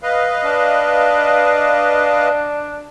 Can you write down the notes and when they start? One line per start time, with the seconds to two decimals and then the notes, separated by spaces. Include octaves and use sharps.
0.03 B4 D#5 F5
0.44 D4